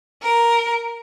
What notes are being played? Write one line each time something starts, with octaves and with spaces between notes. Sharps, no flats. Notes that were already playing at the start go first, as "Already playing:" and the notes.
A#4